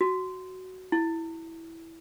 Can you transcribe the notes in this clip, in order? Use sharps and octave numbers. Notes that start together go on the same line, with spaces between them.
F#4
E4